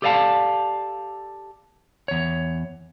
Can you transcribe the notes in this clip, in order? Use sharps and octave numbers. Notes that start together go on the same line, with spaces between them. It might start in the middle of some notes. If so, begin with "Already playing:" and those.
G4 A4 D5 D#5 F5 A5
E2 C#5